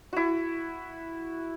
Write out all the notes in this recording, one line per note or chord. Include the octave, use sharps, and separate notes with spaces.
E4 F#4